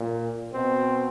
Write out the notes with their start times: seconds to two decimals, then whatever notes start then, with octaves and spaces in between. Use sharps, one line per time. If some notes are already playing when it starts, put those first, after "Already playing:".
Already playing: A#2
0.53 B2 C4